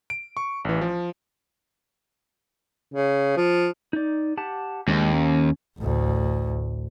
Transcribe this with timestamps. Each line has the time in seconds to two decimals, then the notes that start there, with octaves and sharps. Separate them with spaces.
0.10 D7
0.37 C#6
0.65 A1 E3
0.81 F3
2.94 C#3
3.37 F3
3.93 D#4 D5
4.37 G4 F#5 A5
4.88 D#2 G#3 D4 D#5
5.13 C#4
5.78 A1 D2